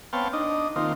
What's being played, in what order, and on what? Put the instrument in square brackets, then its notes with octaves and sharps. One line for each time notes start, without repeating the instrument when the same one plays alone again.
[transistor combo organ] B3 C4 C#5 F5 G5 A5
D4 D#4 D#5
D#3 A#3 C4 D#4 F4